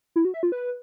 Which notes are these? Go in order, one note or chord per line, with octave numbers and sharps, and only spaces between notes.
E4
F#4
E5
F4
B4